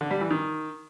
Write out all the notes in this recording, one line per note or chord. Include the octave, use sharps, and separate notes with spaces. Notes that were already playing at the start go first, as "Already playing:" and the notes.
D3
G3
E3
D#3